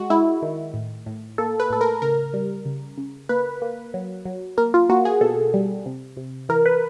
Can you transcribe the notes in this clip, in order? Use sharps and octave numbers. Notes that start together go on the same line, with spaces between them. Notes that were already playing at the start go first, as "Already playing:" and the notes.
Already playing: G#3 F#4
G#3 E4
D#3
A2
A2
A#3 A4
B4
A2 A4
A#4
C#3 A#4
G3
C#3
C#3
A#3 B4
A#3
F#3
F#3
A#3 A#4
F4
A#3 F#4
G#4
B2 A4
G3
C3
C3
E3 A#4
B4